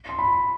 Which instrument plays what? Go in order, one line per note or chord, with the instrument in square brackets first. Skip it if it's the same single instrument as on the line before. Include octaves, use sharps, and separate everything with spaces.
[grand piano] C6
B5